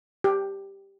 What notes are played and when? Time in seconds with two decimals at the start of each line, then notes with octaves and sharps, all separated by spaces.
0.24 G4